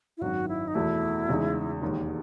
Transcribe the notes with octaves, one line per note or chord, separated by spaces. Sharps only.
E4
G#1 F#2 D#3 F#4
E4
D#4
E2 B2 A3 E4
E2 C#3 G#3 D#4
E1 D#2 D#3